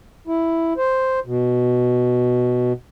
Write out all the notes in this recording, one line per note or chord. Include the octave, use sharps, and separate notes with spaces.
E4
C5
B2